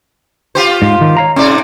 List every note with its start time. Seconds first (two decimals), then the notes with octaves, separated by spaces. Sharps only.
0.55 F4 G4 C5
0.82 G#2
1.01 D#3
1.17 C#5 F5 A#5
1.36 G#2 C3 C#4 D5